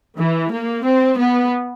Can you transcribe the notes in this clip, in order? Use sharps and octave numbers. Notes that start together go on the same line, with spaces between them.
E3
A#3
C4
B3